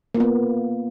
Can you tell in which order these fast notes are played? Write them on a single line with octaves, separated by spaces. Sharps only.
A#3 F4 B3